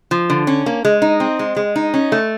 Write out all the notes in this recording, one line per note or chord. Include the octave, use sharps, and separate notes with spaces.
F3
D3
C#4
A#3
G#3
D#4
C4
G#3
G#3
D#4
C#4
A3